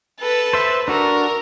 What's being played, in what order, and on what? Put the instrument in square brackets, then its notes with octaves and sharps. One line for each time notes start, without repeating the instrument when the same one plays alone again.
[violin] A4 B4
[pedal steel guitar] C5 E5
[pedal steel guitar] D4 F#4 A4 [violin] A#4